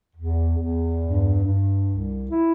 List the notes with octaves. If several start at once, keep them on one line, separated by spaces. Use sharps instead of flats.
E2
E2
G2
G2
C2
E4